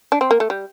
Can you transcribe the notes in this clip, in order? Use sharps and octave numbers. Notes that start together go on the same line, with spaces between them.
D4
C4
A#3
A3
G3